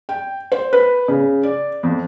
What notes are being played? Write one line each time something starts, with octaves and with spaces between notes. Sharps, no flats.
G5
C5
B4
C#3
D5
F2